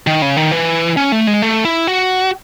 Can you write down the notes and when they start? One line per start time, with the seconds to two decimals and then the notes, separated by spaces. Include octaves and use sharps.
0.07 D#3
0.22 C#3
0.37 D#3
0.51 E3
0.97 C#4
1.12 A3
1.27 G#3
1.42 A3
1.65 E4
1.87 F#4